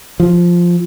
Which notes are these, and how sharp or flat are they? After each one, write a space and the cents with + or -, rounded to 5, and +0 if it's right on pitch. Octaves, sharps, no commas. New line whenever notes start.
F3 +0